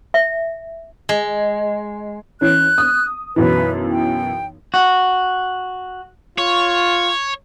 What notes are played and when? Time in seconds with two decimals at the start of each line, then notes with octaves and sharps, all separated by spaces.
0.14 E5
1.09 G#3
2.41 E3 C#4 F#6
2.78 D#6
3.36 B1 F#2 E3 B4
3.90 G5
4.74 F#4
6.38 F4 C#5